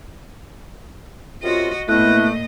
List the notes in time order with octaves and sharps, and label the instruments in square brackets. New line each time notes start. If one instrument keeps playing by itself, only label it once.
[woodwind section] F#2 C3 F4 [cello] F#4 D#5
[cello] A#2 D#5 [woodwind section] A3 [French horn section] B3 E4 [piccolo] F#6